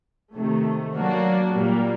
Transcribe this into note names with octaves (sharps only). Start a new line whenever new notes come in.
C3 D#3 A3
F#3 A#3 D4 F#4
A#2 G3 A#3